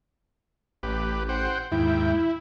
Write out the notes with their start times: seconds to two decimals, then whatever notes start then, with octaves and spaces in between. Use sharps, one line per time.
0.83 A1 G4 B4
1.29 C5 F#5 G5
1.72 D#2 G#2 E4 G5